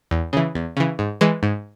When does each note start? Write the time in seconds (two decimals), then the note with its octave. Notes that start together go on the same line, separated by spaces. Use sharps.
0.11 E2
0.33 C#3 E3
0.55 E2
0.77 C#3 E3
0.99 G#2
1.21 E3 G#3
1.43 G#2